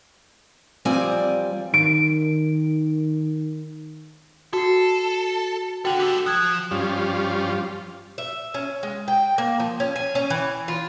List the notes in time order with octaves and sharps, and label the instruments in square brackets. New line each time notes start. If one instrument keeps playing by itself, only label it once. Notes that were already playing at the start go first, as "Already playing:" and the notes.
[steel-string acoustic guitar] E2 F3 G3 C4 D5 G#5
[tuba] D#3 [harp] D7
[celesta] F#4 C7 [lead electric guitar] A4
[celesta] F#4 G5 [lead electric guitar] A4 F#5
[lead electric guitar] G4 A4
[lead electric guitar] F3 [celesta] F#6 G#6
[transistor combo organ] G2 F3 G3 C#4 F4
[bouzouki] E5
C#4
G#3
G5
A#3
F3
C#4
G#5
C#4
E3
F4